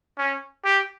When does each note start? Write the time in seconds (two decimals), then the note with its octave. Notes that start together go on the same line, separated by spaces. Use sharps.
0.18 C#4
0.65 G4